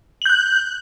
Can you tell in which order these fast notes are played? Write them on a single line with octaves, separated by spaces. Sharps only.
F#7 G6 F#6